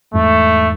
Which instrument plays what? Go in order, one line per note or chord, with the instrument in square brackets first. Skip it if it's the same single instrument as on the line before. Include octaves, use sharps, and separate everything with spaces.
[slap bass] E2 G#2 [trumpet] A3